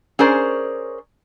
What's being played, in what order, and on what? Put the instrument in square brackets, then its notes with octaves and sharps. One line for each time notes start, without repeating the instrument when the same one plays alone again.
[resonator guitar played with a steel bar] C#4 G#4 A#4 C5 D5